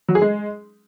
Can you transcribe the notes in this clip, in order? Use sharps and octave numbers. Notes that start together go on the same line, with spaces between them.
F#3
G#4
G#3